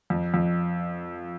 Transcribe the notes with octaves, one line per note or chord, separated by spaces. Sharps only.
F2
F2